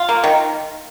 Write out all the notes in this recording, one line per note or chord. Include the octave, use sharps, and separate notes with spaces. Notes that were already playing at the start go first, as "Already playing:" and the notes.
Already playing: F4
A#3
D#3